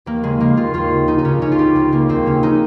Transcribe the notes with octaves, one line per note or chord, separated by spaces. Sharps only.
D#2 A#3
C#3 G#3
C#3 A#3
D#2 F4
D#2 F4
C#3
C#2 D#4
D#4
C#3 C#4
C#3 C#4
F4
C#2 G4
C#2 G#3
C#3 A#3
D#2 C4
C#3 C#4
C#3 D#4